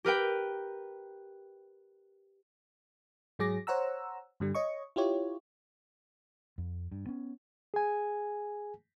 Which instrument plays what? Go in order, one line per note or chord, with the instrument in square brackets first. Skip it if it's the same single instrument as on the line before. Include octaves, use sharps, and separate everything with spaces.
[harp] G4 A#4 B4 G5
[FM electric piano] G#2 F#3 G#4 D6 A#6
C5 C#5 F#5 A#5 E6
G2 D3 G3
C#5 D#5 C#6
E4 F4 G4 C#5
[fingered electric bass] F2
G2
B3 C#4
[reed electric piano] G#4 G#5